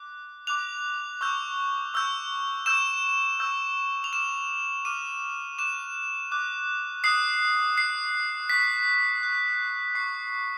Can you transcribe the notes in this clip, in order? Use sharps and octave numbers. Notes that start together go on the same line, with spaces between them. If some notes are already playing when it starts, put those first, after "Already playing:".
Already playing: D6 F#6
D6 F#6 F7
C#6 E6 G6
C#6 E6 G6
C#6 E6 G6 E7
C#6 E6 G6
F7
D6 F6 E7
D6 F6 D#7
D6 F#6 E7
D6 F#6
D#6 F#6 C7
D#6 F#6 C7
C#6 F#6 B6
C#6 F#6
C#6 F#6 C7